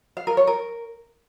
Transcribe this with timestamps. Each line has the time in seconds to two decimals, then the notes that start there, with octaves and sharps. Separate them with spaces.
0.17 F5
0.27 A#4
0.37 C#5
0.47 A#4